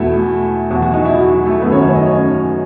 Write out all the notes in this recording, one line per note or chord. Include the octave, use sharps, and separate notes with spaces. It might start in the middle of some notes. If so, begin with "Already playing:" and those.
Already playing: E2 B2 A3 E4
E2 B2 F#3 F#4
F#3 F#4
D#4
E4
F#3 F#4
A3 A4
F#2 D#3 A3 B3 B4
C#4 C#5
C#4 C#5
D#4 D#5
C#4 C#5